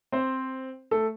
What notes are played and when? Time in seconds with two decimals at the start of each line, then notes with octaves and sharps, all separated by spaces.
0.12 C4 C5
0.91 A3 A4